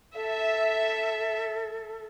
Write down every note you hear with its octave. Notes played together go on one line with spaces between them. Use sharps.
A4 E5